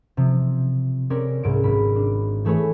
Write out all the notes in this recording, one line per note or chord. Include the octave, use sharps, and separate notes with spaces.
C3 F3
C4 C#4 G4 A#4 C#5 D5
C2 G#2 D7
G#1 B5
D4
E3 A3 G#4 B4 C#5